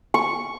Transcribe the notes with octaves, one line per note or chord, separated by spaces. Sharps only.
C#6